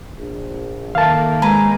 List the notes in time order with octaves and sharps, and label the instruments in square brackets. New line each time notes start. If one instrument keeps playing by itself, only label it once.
[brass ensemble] A#1
[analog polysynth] D#3 A#3 [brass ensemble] A4 A#4 E5 [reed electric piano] F5 A5
[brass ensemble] G#3 [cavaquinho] B4 G#5 A#5